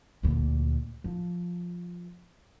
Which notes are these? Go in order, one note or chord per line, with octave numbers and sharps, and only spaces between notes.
D2 A#2
F3